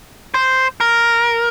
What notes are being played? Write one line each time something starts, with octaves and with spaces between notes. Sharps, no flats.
C5
A#4